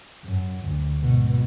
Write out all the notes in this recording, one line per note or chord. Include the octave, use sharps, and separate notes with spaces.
F#2
D2
G#2 B2